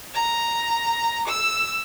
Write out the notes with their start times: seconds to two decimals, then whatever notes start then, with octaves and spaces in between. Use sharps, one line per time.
0.14 A#5
1.27 E6